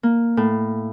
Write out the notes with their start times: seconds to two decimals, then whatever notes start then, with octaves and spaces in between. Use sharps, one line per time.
0.03 A#3
0.37 A2